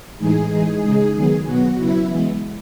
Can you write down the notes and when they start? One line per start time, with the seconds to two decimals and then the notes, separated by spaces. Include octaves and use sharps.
0.18 A2 E3 G#3 D#4 G#4
0.49 E3 G#3 D#4
0.82 C#3 G#3 D#4
1.13 D#3 F#3 B3
1.46 B2 F#3 B3 F#4
1.77 C#3 F#3 B3 E4
2.09 E3 G#3 B3